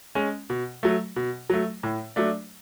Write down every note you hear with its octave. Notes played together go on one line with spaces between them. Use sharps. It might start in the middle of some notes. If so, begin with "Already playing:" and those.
G#3 C#4
B2
F#3 A3
B2
F#3 A3
A2
F#3 A3 D4